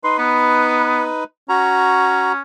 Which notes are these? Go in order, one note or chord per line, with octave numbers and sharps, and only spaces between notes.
D#4 B4 C6
B3
C#4 F#4 A#5